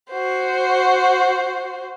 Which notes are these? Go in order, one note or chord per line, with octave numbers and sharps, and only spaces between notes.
F#4 C5